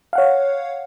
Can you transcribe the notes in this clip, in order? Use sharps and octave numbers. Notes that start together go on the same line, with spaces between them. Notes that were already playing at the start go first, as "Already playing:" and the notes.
C#5 F5 F#5